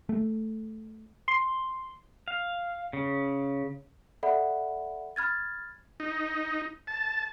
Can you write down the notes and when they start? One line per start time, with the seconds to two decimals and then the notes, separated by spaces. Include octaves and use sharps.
0.09 A3
1.28 C6
2.28 F5
2.93 C#3
4.23 A4 D5 E5 F#5 B5
5.16 B5 F6 G#6 A6
6.00 D#4
6.87 A5